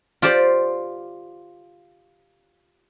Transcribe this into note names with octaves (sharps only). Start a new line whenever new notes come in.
F4 G4 C5 D5